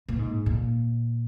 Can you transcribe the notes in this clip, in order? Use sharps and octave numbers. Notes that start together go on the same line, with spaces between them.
A#2
G#2
A#2